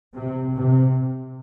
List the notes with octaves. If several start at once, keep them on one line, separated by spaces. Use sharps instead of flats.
C3
C3